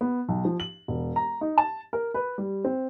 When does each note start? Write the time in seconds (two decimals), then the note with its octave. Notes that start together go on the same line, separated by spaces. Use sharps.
0.01 B3
0.28 B1
0.45 F3
0.60 F#7
0.88 E1
1.16 A#5
1.41 D#4
1.58 A5
1.93 A#4
2.14 B4
2.38 G3
2.64 C4